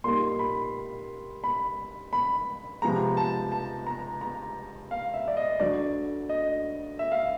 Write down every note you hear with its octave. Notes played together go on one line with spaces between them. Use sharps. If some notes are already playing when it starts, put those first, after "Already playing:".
A#2 G3 A#3 D#4 C6
B5
B5
B5
C3 F3 G#3 B3 A#5
A5
A5
A#5
A#5
F5
E5
D5
D#5
D2 D3 F#3 A3 D5
D#5
E5
F5